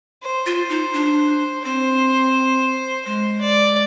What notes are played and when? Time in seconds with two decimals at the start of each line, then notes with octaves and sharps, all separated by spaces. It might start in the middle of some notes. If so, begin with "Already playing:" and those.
0.23 C5
0.46 F4
0.69 D#4
0.93 D4
1.64 C4 C5
3.05 G#3 C5
3.41 D5